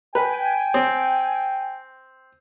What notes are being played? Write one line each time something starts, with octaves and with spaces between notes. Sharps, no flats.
B4 G5 G#5
C4